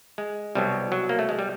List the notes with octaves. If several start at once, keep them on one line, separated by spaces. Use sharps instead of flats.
G#3
C2 B2 F#3 G3
F#3
A#3
A3
G#3
G3